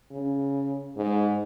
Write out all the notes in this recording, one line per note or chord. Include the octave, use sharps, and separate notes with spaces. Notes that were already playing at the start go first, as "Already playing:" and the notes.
C#3
G#2